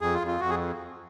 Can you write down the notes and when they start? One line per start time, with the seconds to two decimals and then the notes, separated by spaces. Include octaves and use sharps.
0.01 F2 G#4
0.14 F4
0.21 F2
0.27 F4
0.40 F2 F#4
0.50 G#4